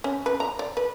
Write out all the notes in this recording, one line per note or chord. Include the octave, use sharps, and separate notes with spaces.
C#4
B4
A#5
D5
B4